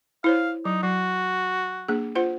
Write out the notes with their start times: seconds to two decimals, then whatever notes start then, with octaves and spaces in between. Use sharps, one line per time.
0.24 E4 C5 C#5 F5
0.65 F#3 D#4
0.83 F#3 F#4
1.88 A#3 D4 G#4
2.15 F4 C5 F#5